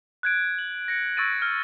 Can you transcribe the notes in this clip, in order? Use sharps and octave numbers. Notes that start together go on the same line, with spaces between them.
F#6 G#6 D7
F#7
A#6 C#7
C#6 E6 G#6 A6 D7 D#7
F6